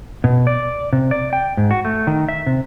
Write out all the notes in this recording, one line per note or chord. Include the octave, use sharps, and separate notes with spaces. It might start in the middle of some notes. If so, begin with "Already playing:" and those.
B2
D5
C3
D5
G5
G#2
F#4
A3
D#3
E5
C3